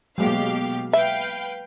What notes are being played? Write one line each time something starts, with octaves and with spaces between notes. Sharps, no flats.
B2 F#3 G#3 A#3 G4 F5
B4 E5 F5 G5